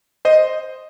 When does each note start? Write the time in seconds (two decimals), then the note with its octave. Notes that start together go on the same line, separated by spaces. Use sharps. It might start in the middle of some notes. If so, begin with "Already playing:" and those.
0.25 C5 D#5